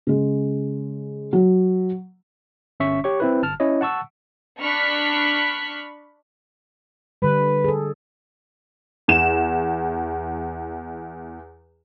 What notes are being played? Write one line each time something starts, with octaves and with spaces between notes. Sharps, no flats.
C#3 G#3
F#3
G1 C#4 E5 C#6 B6
G4 C#5 C#6
C4 E4 B4
G1 A5 F6
C#4 E4 C#5 D#5
F#5 A5 C#6 E6
D4 B5 C#6 F6 F#6 B6
D3 G3 B4
G#4 A4
E2 E7